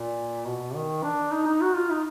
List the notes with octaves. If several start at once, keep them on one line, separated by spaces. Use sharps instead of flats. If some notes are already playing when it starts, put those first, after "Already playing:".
Already playing: A#2
B2
D#3
D4
D#4
D#4
F#4
F4
D#4